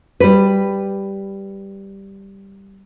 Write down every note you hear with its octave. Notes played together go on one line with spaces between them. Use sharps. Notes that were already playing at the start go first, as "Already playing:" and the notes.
G3 B4